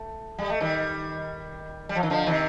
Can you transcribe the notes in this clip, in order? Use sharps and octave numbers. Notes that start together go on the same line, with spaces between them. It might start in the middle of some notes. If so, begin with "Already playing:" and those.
Already playing: A3
G3
A3
D#3 G3
G3
F3
D#3
D3 F3
C3 D#3